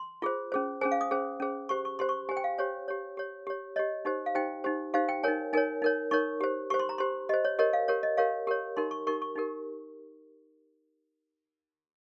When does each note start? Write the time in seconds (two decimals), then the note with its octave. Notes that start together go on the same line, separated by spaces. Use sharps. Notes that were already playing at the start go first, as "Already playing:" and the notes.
Already playing: C6
0.22 F4 G#4 C5
0.52 C#4 G#4 C5
0.81 C#4 G#4 C5 G#5
0.91 F5
1.01 D#6
1.11 C#4 G#4 C5
1.40 C#4 G#4 C5
1.69 G4 C5 C#6
1.85 C#6
1.99 G4 C5 C6
2.09 C#6
2.29 G4 C5 G#5
2.37 G5
2.44 F5
2.58 G4 C5 C#5
2.88 G4 C#5
3.17 G4 C#5
3.47 G4 C#5
3.76 G4 C#5 D#5
4.05 D#4 G4 C5
4.26 F5
4.35 D#4 G4 C5 G5
4.64 D#4 G4 C5
4.94 D#4 G4 C5 F5
5.09 G5
5.23 D#4 A#4 C#5 G#5
5.53 D#4 A#4 C#5 G#5
5.82 D#4 A#4 C#5
6.11 D#4 A#4 C#5 C#6
6.41 G4 C5
6.70 G4 C5 C#6
6.79 C6
6.89 A#5
6.98 G4 C5 C6
7.29 G4 C5 D#5
7.45 C#5
7.59 G4 A#4 C#5 D#5
7.73 F5
7.88 G4 A#4 C#5
8.03 D#5
8.17 G4 A#4 C#5 F5
8.47 G4 A#4 C#5
8.77 D#4 G4 A#4 C6
8.91 C#6
9.07 D#4 G4 A#4 C#6
9.22 C#6
9.36 D#4 G4 A#4